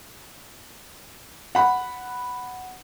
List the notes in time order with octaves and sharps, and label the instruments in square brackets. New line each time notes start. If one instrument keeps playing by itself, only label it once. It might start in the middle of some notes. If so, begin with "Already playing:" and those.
[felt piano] F#5 B5